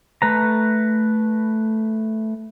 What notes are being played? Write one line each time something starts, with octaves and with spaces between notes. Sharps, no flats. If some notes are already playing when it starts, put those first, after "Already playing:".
A3 B4 A#5